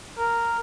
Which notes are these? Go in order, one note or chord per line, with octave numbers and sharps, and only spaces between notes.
A#4